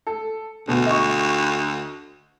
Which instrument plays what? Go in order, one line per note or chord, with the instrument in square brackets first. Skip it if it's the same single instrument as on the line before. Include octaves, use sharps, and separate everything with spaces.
[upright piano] A4
[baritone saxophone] D2 [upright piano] B2
[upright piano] D#5 C#6